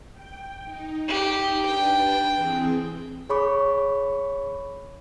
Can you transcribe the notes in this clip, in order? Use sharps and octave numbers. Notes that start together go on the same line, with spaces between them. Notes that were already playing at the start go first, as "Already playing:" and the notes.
G5
D#4
G4
D4 B4 G5 A5
E3 C4 G#4
G#4 C#5 B5 C#6 D6